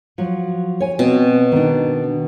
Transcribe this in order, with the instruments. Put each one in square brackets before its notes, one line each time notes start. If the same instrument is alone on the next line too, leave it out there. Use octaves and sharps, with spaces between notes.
[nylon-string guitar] F3 F#3
C#5 G#5
[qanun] B2 [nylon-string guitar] C4
[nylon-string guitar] D#3 D4